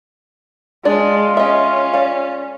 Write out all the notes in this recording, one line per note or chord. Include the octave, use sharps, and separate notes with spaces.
G#3 D4 F4 D5
C#4 D#5 E5
D5 F5